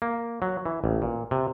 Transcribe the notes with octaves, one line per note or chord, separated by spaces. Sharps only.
A#3
F#3
E3
A1
A#2
C3